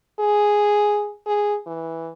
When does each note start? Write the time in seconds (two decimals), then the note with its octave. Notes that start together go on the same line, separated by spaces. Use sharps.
0.19 G#4
1.27 G#4
1.67 E3